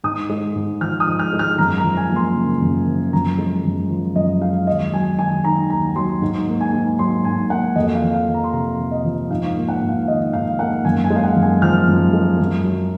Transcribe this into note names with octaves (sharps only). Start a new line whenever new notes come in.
G#2 D#6
G#3
G#2
F3 F6
D#6
G#2
F6
G#3
F6
F#2 A#5
A#5
F3
G#5
A#3
C6
C#3
F#2
F3
F#2 A#5
G#3
F#2
F3
F#2 D#5
G#3 F5
D#2 D#5
F#3 G#5
D#2 G#5
D#3 A#5
D#2 A#5
F#3 C6
G#2
A#3
G#5
G#2
F#3 C6
G#2 G#5
A#3 F#5
F2 D#5
F5
F3
F5
F2
A#5
C6
C3 A#5
F2
D#5
F3
G#2 F5
A#3
F#5
G#2
F5
D#3 D#5
G#2 F5
A#3 F#5
F#2 G#5
G#5
G#3
F5
F#5
F#2
G#5
F3 F6
F#2
G#3
F#2
F#3